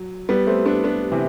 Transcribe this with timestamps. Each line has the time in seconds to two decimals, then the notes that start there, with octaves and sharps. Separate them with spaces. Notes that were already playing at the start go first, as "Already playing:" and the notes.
Already playing: F#3
0.29 G3 B3
0.47 A3 C4
0.66 B3 D4
0.84 B3 D4
1.12 C3 E3